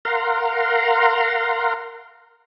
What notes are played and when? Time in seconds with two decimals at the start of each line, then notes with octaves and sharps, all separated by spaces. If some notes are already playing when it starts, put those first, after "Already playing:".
0.05 A#4 F5 F#5 A#5 C6